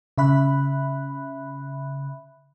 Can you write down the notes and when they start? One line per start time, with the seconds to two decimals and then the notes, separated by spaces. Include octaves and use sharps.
0.18 C#3 E5 B5 F#6